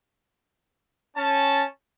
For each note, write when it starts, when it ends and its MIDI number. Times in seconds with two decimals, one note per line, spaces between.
1.16 1.64 61
1.16 1.64 81